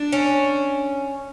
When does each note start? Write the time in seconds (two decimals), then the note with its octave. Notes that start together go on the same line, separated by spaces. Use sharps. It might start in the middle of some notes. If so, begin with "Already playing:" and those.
Already playing: D4
0.12 C#4